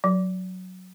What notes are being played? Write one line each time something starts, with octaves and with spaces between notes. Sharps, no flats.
F#3